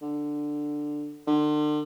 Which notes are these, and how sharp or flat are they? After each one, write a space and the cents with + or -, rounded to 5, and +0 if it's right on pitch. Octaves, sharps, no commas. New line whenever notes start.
D3 +10
D3 +40